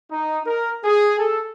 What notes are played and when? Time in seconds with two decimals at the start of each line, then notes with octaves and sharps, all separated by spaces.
0.11 D#4
0.46 A#4
0.84 G#4
1.19 A4